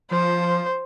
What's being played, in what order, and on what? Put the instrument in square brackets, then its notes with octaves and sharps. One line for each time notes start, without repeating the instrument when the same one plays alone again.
[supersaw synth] F3 [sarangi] C5